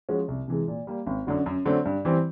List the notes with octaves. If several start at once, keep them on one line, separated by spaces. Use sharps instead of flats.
F3 G#3 C#4 F#4
C2
C3 E3 G#3
A#2
G3 A#3
G#1
F#2 D3 F#3
F#2
D3 F#3 A3 C4
G2
E3 G3 C4